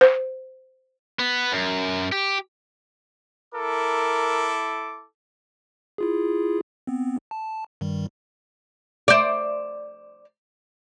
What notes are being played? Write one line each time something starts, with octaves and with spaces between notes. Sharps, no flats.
C5
B3
F#2
G4
E4 A4 A#4 D6
E4 F4 G#4
B3 C4
A5
G2 D#3 G3
C5 D5